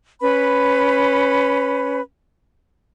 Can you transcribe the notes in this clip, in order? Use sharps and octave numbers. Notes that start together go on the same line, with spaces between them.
C#4 B4 B5